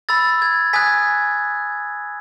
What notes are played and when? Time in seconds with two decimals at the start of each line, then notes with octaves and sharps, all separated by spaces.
0.09 B5 E6 A6
0.42 G#6
0.73 G#5 D#6 F#6 G#6 B6